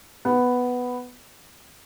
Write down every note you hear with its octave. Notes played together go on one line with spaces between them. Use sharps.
B3